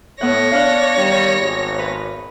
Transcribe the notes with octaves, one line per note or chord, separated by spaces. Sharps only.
A2 B3 C#5 F#5 A#6
D4 F5 F#6
D#3 G3
G#1
B4